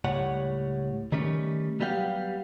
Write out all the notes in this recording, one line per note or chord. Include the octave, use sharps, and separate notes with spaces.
C#2 A2 G3 C#5 F#5
D#3 G3 A3 C#4
F#3 G3 B3 G4 F5 F#5